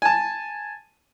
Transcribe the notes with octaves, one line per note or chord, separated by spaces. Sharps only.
G#5 A5